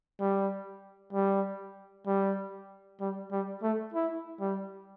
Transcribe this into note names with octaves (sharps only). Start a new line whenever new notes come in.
G3
G3
G3
G3
G3
A3
E4
G3